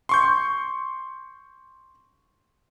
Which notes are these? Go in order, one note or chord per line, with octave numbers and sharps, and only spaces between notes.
C6 C#6 G6